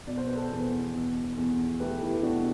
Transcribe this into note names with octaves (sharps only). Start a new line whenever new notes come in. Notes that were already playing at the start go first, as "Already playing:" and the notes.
B2 D5
C5
B4
A4 C5
E2
B2
E2
A3 G4 B4
E4 G4
G4
B2 D4 F#4